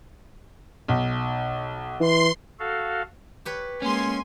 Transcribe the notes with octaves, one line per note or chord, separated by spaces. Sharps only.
B1
E3 C6
F#4 A4 F5
G4 B4 C#5
G#3 A#3 C#4 G#5 C6